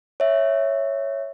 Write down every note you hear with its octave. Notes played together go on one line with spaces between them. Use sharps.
C#5 E5